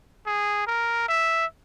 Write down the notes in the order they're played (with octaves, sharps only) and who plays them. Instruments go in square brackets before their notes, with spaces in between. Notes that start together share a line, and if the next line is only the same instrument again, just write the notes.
[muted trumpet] G#4
A#4
E5